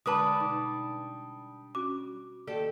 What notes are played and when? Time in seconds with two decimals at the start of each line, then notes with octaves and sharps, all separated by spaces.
0.06 D3 G3 G#3 D4 B4 A5 D6 D#6
0.40 B2 D#4 D6
1.75 C#4 F#4 D6
2.47 D#2 G4 A4 D5